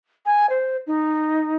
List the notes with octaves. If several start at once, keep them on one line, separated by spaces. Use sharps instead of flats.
G#5
C5
D#4